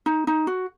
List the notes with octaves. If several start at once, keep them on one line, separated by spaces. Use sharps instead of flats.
D#4
D#4
F#4